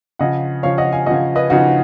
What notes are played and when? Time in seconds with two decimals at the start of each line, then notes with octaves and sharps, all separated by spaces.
0.19 C#3 F3 D#5 F#5
0.63 C#3 F3 C#5 F5
0.78 D#5 F#5
0.92 F5 G#5
1.06 C#3 F3 D#5 F#5
1.35 B4 D#5
1.50 C#3 F3 D#4 F#4